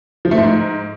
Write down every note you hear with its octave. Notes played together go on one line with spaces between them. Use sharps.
F3
A3
G#2